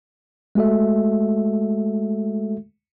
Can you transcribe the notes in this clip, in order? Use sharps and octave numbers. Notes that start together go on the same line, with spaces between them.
G#3 A3 F#4 A4 E5